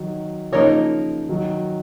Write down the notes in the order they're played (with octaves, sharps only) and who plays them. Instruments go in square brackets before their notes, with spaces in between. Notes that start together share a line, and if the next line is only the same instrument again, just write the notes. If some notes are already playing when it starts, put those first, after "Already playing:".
Already playing: [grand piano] D#3 F#3
[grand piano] C#3 F3 [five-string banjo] A#3 D#4 A#4 C#5
[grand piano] D#3 F#3